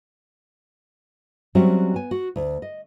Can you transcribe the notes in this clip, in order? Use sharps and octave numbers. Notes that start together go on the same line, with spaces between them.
F#3 G3 C4 C#4 F#4 E5
B3 G#5
F#4
D2
D#5